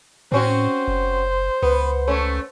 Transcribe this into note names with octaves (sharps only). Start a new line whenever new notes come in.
A2 C4 C#4 F#4 C5
F#1
C#2 B3
A3 C#4